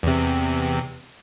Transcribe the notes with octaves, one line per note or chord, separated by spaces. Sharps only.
E2 C3